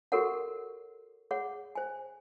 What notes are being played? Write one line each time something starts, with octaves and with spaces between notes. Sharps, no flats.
F#4 G4 A4 A#4 C#5 F#5
G#4 C#5 F#5
C5 G#5